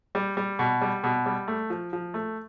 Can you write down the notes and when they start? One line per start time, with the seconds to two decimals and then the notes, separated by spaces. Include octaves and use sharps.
0.15 G3
0.37 G3
0.59 B2
0.81 G3
1.04 B2
1.26 G3
1.48 A3
1.70 F3
1.93 F3
2.14 A3